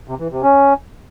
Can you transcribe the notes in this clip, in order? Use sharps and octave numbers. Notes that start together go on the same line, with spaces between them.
C3
E3
C3
C#4